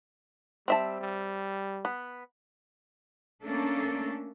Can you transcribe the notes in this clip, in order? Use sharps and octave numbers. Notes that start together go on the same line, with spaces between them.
G3 C4 E5 A5
G3
B3
A3 A#3 C#4 D4 A4